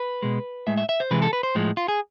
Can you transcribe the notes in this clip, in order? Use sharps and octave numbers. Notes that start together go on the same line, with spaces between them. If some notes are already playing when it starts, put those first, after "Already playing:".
Already playing: B4
B2 G#3
A2 G#3 E5
E5
E5
C5
C3 E3 G#3 B4
A4
B4
C5
A2 F3 G#3
F4
G#4